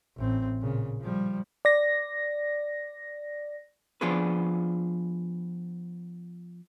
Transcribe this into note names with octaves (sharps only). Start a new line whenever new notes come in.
A1 C4
A#2 C#3
F3 G3
D5 A#6
F3 B3 D4 F4 G#4 B4